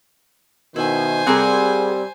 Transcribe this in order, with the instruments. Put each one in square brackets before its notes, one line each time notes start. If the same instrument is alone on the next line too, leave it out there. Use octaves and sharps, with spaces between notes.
[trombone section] B2 D#3 [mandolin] E4 [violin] C5 G#5
[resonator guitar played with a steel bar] C3 C4 A#4 [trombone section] G3 [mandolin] G#4 F#5